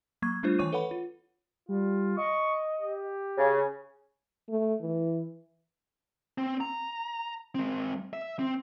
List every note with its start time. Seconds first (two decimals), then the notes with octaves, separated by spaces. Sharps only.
0.22 F#3 A#3 C#6 G#6
0.43 G3 A3 D4 F4 C5
0.59 D#3 E3 C#5 C#6 D6 D#7
0.73 A4 B4 C#5 F#5 B5
0.91 F4
1.69 G3 F4
2.18 D#5 C#6
2.80 G4
3.38 C#3 G#5
4.49 A3
4.82 E3
6.38 C4
6.61 A#5
7.55 G#3 C4
8.13 E5
8.39 C4